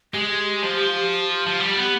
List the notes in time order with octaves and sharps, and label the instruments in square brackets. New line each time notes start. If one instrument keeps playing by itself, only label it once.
[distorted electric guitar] G#3 [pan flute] G4
[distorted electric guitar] F3
[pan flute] G4
[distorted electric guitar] F3
G3
B3